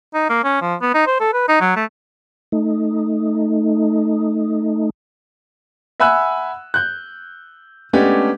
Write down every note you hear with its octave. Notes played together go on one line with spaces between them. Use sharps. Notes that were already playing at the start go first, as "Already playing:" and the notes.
D#4
A#3
C#4
F3
B3
D#4
C5
A4
B4
D#4
F#3
A3
A3 D#4
E5 F#5 G#5 B5 E6 F#6
F#6 G6
G#3 A3 B3 C#4 D4 G4